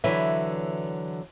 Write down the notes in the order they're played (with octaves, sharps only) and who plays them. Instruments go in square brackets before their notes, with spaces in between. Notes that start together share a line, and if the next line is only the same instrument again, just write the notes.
[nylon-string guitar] D3 E3 F#3 B4 C#5 E5